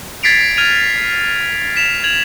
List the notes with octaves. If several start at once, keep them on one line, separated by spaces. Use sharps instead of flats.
G#6 A6 B6 C7 D7 F7
F6 G#6 D#7 F7
B6 E7 F7
G#6 F7 F#7